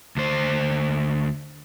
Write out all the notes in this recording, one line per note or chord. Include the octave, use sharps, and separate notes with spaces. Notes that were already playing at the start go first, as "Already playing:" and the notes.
D2 C5